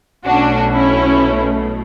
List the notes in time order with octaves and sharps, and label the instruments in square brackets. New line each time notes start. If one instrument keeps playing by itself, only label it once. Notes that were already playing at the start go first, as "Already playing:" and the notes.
[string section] B1 B2 A3 C#4 D4 F#4
C#4 E4